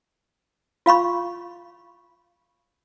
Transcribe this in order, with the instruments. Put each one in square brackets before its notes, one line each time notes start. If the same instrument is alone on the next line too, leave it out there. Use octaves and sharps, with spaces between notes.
[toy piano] F4 F5 B5 C#6